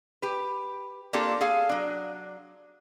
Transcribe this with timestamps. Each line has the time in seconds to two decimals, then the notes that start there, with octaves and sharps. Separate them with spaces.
0.22 G4 B4
1.13 A#3 C4 D4 F4 G4 A4
1.41 G#4 A4 F5 G#5
1.69 F#3 D4